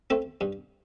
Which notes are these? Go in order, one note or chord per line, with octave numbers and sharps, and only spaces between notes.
A3 C4
G2